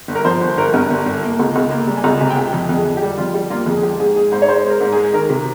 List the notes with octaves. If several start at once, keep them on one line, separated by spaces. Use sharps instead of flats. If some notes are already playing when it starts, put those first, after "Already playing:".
G1
A#4
F3 C5
G1
G1 A#4
G2
G1
G1
A#3
C#2
C#2
A#3
G3
G#5
C#2 A#5
C3 G#5
G5
C#2 G#5
F2 G5
F2 G#4
F2
G4
G3
F2 F4
G3 G4
A#3 F4
F2 G#4
G#4
G#3 G4
G#2 G#4
G#3 G#4
G#2 C5
C#5
G#3 C5
G#3
A#4
G#2
G#3 G#4
D#3 A#4
C3